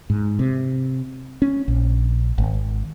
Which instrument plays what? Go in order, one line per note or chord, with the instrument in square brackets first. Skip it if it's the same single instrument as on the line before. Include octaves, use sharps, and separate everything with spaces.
[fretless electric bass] G#2
C3
C#4
A#1
G#1